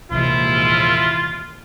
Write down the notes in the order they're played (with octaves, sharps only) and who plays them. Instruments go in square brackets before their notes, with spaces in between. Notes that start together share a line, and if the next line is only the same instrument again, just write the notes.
[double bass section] A#1 D#2 G#2 [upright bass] C3 E3 [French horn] E4 [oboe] F4